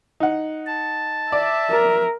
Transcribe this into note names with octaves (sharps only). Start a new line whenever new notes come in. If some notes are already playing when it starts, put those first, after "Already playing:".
D#4 F#5
A5
D5 E5
A#4